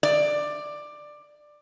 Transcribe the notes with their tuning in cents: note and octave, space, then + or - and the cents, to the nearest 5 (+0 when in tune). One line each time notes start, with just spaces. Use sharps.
D5 +15